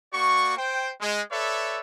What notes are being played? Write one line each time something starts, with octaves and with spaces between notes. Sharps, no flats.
A#3 F#4 D5 C#6
C5 G5
G#3
A4 B4 C#5 D5 E5